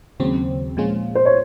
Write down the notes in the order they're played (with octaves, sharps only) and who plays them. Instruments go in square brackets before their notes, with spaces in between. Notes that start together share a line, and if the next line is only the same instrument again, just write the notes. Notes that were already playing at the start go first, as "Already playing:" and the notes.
[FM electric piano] D#2 C#3 F#3 C4
A#2 F3 G#3 C#4 F4
[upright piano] C5
C#5